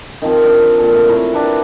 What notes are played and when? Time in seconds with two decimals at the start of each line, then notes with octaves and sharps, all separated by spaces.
0.22 D#3 F3 C4
0.44 D4
0.79 A#2 A4
0.94 A3
1.09 E4 A#4 C#5
1.33 D4 G4 A#4 B4